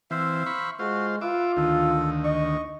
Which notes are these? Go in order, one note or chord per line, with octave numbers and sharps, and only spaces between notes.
E3 C4 C5 E5 F5
B5 C#6
G#3 F4 F#4 C5
F4 B4 E5 D6
D2 D#3 A4
D#5 C#6